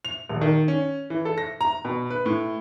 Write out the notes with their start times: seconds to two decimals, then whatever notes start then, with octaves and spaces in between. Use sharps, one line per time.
0.05 F7
0.29 D#1
0.41 D#3
0.68 C#4
1.10 E3
1.25 A4
1.38 A#6
1.61 A#5
1.85 B2
2.10 B4
2.26 A2